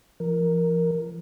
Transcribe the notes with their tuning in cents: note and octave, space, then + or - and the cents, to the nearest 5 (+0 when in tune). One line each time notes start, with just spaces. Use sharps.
F3 -40 A#4 +0